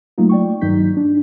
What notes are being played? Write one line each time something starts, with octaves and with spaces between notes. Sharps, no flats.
F#3 A3 A#3 D#4 F4
D5 G5 C#6
G2 D#3 F#3 D#4 G6 B6
D4